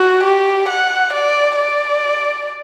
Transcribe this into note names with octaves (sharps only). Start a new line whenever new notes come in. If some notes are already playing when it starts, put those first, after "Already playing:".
Already playing: F#4
G4
F#5
D5
D5